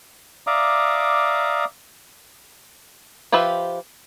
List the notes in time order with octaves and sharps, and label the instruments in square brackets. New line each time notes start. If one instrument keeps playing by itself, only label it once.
[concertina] D5 E5 F5 A#5 D6 D#6
[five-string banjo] F3 F4 G4 B4 E5